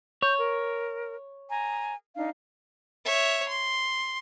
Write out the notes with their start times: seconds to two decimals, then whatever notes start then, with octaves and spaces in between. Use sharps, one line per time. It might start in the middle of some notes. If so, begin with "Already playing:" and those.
0.22 C#5 G6
0.40 A#4
1.50 G#5 A#5
2.16 D4 D#4 F5
3.05 C#5 E5
3.48 C6